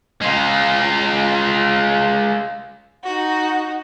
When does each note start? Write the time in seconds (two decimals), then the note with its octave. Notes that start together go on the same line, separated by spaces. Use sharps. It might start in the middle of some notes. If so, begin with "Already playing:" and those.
0.22 G#3 F4
3.04 D#4 F#4